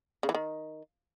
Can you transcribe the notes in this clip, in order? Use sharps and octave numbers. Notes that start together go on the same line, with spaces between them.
C#3
E3
D#3